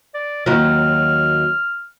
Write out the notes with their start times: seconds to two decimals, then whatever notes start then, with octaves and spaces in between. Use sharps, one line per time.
0.15 D5
0.46 D#2 F#3 F6